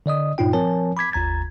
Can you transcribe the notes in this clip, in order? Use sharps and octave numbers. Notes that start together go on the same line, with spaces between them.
D3 D5 D#5 D#6
G2 A#2 D#4 F4 G5
F3 C4 A#4 C#5 G#5 A5
B5 D6 G#6 B6
G1 D#2 A#5 G#6 A6